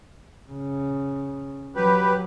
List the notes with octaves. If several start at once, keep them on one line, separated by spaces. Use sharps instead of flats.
C#3
F#3 G4 B4